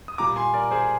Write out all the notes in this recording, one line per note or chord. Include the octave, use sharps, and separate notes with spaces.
D#6
A#2 G3 A#5 D6
G#5 C6
A#4 D5
G#4 C5